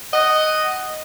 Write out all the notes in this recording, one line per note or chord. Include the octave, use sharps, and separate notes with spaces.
D#5 F#5